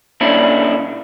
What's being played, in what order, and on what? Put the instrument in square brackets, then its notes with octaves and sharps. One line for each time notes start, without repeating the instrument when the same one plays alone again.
[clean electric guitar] A#2 C#4 D4 E4